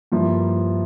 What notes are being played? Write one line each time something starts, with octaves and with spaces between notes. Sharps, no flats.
G2 F3 A#3 E4